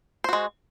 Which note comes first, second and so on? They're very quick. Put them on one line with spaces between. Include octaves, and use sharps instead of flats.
C5 F#4 G#3